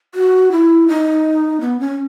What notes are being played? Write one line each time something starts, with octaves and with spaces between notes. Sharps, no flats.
F#4
E4
D#4
B3
C#4